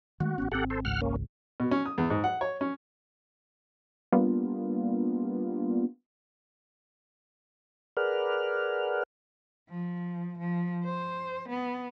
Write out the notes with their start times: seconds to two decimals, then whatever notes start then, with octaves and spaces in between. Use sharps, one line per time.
0.20 D#3 G#3 A3 F#4
0.38 A1 B3 C#4
0.52 G#1 C4 G4 A4 F#5
0.70 A4 C5
0.85 G#1 C#2 G#2 F#5 F6
1.01 A#3 C#4
1.60 B2
1.71 C#4
1.86 D#6
1.98 E2
2.10 G#2
2.24 F#5
2.41 C#5
2.61 C#4
4.12 G3 A#3 B3 D4 F4
7.97 G#4 A#4 B4 D5 F#5 F6
9.69 F3
10.38 F3
10.84 C5
11.48 B3